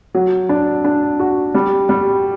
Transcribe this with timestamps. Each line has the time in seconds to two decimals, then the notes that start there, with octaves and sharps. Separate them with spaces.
0.14 F#3
0.49 D4
0.85 D4
1.19 F#4
1.55 G3
1.89 G3